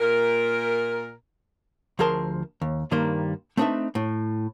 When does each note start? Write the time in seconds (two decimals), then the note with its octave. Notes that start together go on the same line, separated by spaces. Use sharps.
0.01 A#2 A#4
1.99 D2 F3 G#4 A#4 A5 C6
2.62 D#2
2.91 G2 D#3 G3 A#3 C5
3.57 A3 C4 D4 D#4 B4 E5
3.95 A2